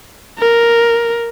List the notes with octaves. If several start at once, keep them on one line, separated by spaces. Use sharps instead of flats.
A#4